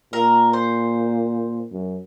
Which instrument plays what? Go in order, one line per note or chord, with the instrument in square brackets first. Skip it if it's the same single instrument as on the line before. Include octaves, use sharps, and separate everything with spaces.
[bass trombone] A#2 [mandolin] A#4
[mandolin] C5
[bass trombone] F#2